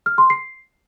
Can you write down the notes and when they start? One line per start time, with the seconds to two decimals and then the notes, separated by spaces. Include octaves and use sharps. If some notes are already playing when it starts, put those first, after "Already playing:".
0.06 F6
0.18 C6
0.30 C7